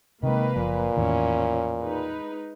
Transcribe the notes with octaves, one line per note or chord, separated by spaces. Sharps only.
C3 D#3 G#3 A#3 B4
F#1 A#2 F3
E2 A2 D#3 C#4 E4
G#3 D#4 B4